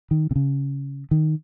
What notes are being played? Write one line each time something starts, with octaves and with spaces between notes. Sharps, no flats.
D#3
C3
C#3
D#3